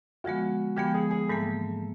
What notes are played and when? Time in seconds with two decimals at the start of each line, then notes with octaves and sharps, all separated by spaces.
0.24 D3 F3 G#3 B3 F#4
0.76 D3 F3 G#3 B3 G4
0.94 G#4
1.11 G#4
1.28 G#2 E3 G3 A#3 A4